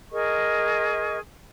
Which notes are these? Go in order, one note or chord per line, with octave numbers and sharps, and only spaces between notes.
G#4 A#4 D#5 C#6